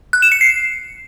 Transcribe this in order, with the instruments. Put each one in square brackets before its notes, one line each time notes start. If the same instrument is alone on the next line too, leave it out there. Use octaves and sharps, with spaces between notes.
[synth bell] F#6
E7
C#7
C7